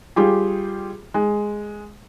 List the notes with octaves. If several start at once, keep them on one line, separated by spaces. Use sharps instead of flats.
G3 F4 G4 G#4
G#3